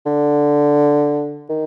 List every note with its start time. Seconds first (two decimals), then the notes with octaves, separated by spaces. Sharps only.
0.06 D3
1.49 D#3